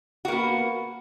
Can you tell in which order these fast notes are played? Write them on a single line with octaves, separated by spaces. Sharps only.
F#4 A#3 B3